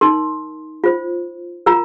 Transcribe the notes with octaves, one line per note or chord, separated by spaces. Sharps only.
D#4 A#4 C6
F4 C5
F4 A#4 A#5